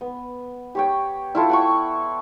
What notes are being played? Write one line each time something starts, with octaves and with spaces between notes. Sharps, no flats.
B3
G4 C#5 G5
E4 F4 A4
F#5 G5 C#6